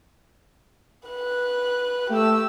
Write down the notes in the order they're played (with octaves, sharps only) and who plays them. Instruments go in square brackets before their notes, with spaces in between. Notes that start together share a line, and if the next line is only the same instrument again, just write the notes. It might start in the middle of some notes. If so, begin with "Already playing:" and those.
[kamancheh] B4 F#6
[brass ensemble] A3 [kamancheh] G4 E6